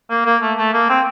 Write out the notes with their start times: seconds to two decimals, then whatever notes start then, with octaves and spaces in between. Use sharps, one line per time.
0.10 A#3
0.26 A#3
0.42 A3
0.58 A3
0.74 A#3
0.89 C4